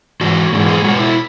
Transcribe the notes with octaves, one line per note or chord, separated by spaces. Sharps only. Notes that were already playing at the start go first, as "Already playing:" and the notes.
G#2 E3 F#4
G#2 E3 G#3
G#4
B2 G#3 F#4
E4